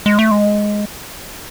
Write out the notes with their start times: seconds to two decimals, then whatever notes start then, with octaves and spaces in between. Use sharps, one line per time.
0.06 G#3
0.19 A3
0.31 G#3